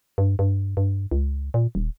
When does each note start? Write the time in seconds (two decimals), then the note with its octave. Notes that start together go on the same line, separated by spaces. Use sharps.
0.18 G2
0.39 G2
0.77 G2
1.11 C#2
1.54 A#2
1.75 D#1